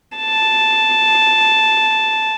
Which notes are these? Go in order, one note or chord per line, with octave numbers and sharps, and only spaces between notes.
A5